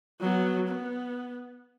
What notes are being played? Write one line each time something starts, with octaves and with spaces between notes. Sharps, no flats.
F#3 B3
B3